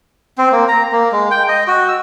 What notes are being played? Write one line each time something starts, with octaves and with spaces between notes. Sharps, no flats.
C4
A#3
A#5
A#3
G#3
G5
D#5
F#4
E6